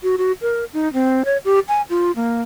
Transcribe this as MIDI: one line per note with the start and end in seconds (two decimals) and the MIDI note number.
0.03 0.16 66
0.18 0.32 66
0.42 0.65 70
0.73 0.91 63
0.93 1.23 60
1.25 1.37 73
1.45 1.60 67
1.68 1.82 80
1.90 2.12 65
2.16 2.42 58